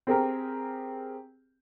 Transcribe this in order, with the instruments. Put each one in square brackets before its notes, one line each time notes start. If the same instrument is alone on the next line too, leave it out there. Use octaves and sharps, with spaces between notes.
[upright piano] C4 G4 G#4 A#4